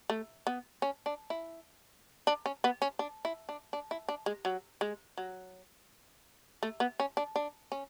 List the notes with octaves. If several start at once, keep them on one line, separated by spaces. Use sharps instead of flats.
A3
B3
C#4
D4
E4
D4
C#4
B3
C#4
D4
E4
D4
D4
E4
D4
G#3
F#3
G#3
F#3
A3
B3
C#4
D4
D4
C#4